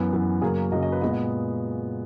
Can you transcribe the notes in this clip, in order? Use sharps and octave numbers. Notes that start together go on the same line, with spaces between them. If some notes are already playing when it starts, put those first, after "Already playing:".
Already playing: F#2 E3 B3
F#2 E3 B3
F#2 C#3 F#3 A#3 G#4
F#2 C#3 F#3 A#3 D#5
D#5
B4
A#2 G#3 B3 D#5
D#5